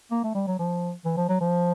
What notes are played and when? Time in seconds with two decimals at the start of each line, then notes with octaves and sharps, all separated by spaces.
0.11 A#3
0.24 A3
0.35 G3
0.47 F#3
0.59 F3
1.05 E3
1.17 F3
1.29 F#3
1.41 F3